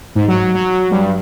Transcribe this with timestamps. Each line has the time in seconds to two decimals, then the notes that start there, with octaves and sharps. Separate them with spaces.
0.15 G#2
0.28 F#3
0.55 F#3
0.91 G2